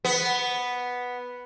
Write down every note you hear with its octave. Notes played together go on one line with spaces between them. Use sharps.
B3